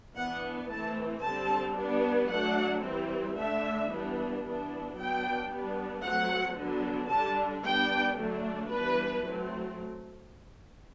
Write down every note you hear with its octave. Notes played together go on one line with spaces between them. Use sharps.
E3 B3 D4 F#5
E3 A3 C4 A5
D3 G3 C4 A5
G3 B3 D4
F#3 A3 D4 F#5
E3 G3 C4
D3 A3 D4 E5
E3 G3 B3 D4
E3 B3 D4
F#3 B3 D4 G5
G3 B3 D4
F#3 A3 C4 F#5
D3 F#3 B3 D4
D3 G3 D4 A5
G3 B3 D4 G5
D3 F#3 A3 D4
E3 G3 B3 D4 B4
F#3 A3 C4